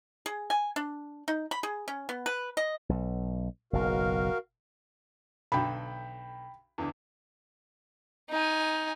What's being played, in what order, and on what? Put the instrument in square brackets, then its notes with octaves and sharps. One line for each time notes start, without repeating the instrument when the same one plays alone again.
[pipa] G#4
G#5
D4
D#4
B5
G#4
C#4
B3
B4
D#5
[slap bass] B1
[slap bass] F#1 B1 [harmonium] F#4 A#4 F5
[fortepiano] B1 D3 [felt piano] G5 B5
[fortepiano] E2 D3
[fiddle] D#4 G#5